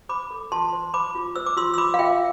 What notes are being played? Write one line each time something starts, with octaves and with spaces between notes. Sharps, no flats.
C5 B5 D6
A4
F4 A5 C6
C5
C5 B5 D6
F4
C5 E6
D6
F4 C6 E6
E6
F4 B5 D6
F5
F4 E5 G5